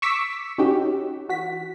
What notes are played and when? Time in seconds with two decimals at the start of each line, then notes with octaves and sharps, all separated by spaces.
0.02 C#6 D6 E6 B6
0.58 C#4 D#4 F#4 G4
1.29 E3 F#4 B6